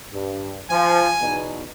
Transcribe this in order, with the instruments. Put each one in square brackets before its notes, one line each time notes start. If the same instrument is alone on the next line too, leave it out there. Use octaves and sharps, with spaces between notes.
[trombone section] G2
[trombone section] F3 [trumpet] G#5
[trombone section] E2 B2 D#4